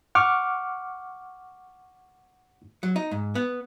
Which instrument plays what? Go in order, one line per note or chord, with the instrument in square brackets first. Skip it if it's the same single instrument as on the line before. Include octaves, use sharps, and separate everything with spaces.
[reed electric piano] F#5 C#6 D6 F6
[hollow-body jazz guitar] F#3
D#4
G#2
B3